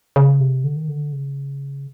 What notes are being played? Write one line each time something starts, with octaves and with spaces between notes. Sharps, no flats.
C#3
C3
D3
D#3
D3
C#3